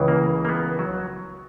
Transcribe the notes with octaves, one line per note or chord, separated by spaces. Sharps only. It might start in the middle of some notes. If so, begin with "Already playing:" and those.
Already playing: C#2 C#3 E3
A#3
A#3
B3
F#3